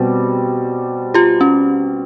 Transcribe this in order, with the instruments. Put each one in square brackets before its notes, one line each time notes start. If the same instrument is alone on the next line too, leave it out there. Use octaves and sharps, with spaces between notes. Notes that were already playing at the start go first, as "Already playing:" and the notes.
Already playing: [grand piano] B2 G3 C4
[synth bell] F4 G4
C#4